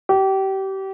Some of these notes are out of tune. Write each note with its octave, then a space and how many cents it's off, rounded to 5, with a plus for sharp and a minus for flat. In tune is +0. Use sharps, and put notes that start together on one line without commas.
G4 -30